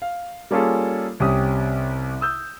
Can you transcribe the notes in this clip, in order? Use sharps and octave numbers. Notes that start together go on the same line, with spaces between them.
F5
G3 A#3 C#4 F4 G#4 A4
C2 C3 C#4 G4 D#6
D#6 E6 G6